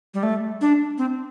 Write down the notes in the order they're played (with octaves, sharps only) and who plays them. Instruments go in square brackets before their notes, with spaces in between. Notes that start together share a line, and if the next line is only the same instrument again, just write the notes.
[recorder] G3
A3
D4
C4